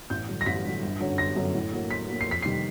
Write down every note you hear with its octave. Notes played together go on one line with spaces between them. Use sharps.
A1 G6
G2 D3 F#3
A#6
A1 B6
G2 D3 F#3
G1
F#2 D3 F#3
G1 A#6
F#2 D3 F#3
A2
F#3 A#3
A2 B6
F#3 A#3
C7
F2 B6
C7
C3 D#3 G3